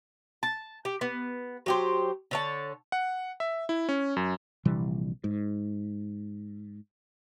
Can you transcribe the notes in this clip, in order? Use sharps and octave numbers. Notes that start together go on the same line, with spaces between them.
A5
G4
B3
F#3 G4 C5
D3 C#5 A5
F#5
E5
E4
C#4
F#2
A#1 C3 E3 G3
G#2